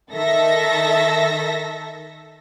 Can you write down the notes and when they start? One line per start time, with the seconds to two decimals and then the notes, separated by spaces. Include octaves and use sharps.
0.12 D#3 A4 E5 A#6